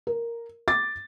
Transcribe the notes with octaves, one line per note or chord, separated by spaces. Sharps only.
A#4
D6 A6